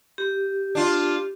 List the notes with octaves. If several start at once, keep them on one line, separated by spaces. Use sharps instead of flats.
G4
D4 F4